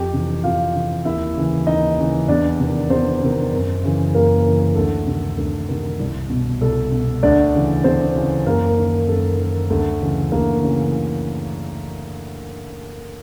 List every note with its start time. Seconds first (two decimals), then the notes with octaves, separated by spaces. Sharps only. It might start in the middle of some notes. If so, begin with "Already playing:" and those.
Already playing: F2 G4 G5
0.13 C3 E3
0.44 F2 F4 F5
0.74 C3 E3
1.05 D#2 E4 E5
1.36 C#3 E3
1.67 D#2 D#4 D#5
1.98 C#3 E3
2.28 E2 D4 D5
2.60 C3 D#3
2.90 E2 C4 C5
3.21 C3 D#3
3.52 F#2
3.84 C#3 E3
4.14 F#2 A#3 A#4
4.45 C#3 E3
4.75 D2 A4
5.07 C3 D#3
5.38 D2
5.69 C3 D#3
6.00 C2
6.30 B2
6.61 C2 A4
6.92 B2
7.23 D2 D4 D5
7.54 C#3 E3
7.84 D2 C4 C5
8.15 C#3 E3
8.46 F#2 A#3 A#4
8.78 D#3
9.09 F#2 A4
9.39 D#3
9.70 D2 A4
10.01 C#3 E3
10.32 D2 A#3 A#4
10.62 C#3 E3